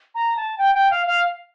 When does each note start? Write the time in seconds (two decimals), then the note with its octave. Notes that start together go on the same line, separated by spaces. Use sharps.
0.15 A#5
0.37 A5
0.58 G5
0.74 G5
0.91 F5
1.07 F5